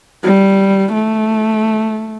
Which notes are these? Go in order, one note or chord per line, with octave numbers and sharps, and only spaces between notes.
G3
A3